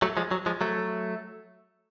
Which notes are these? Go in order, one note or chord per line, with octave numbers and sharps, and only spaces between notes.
F#3 A3
F3 G#3
F#3
F3 G#3
F#3 A3